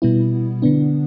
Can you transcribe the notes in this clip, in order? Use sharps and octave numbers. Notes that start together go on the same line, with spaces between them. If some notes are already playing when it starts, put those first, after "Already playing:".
B2 G3 B3 E4
D3 B3 D4